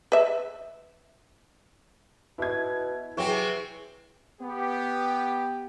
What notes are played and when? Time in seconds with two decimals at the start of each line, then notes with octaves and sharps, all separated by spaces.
0.12 B4 E5
2.38 B2 E4 G#6
3.17 C3 E3 F#3 C4 G#4 C#6
4.42 B3 G4